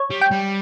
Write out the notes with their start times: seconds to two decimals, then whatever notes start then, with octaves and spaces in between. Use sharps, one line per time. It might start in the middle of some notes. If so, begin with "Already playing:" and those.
Already playing: C#5
0.11 G3
0.21 G5
0.31 G3